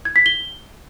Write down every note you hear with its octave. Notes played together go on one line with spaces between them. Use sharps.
G#6
B6
G7